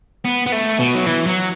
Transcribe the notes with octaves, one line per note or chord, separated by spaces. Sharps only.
B3
B3
A3
B2
F#3
E3
F#3